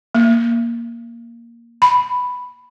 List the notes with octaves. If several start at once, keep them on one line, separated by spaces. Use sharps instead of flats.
A#3
B5